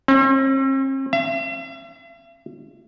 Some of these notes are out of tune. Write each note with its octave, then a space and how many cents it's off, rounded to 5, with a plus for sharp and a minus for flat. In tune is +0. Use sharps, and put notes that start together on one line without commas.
C4 +45
E5 +45